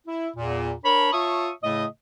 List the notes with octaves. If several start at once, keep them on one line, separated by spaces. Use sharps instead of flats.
E4
E2 A#2
D4 A#4 C#5 A5 B5
F4 C#5 E5 A5 C#6 D#6
A2 C#3 A3 D#5